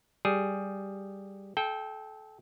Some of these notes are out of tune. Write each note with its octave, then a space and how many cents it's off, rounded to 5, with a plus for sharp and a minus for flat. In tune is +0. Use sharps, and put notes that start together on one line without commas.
G3 +0 G#4 +0
A4 -30 G5 +0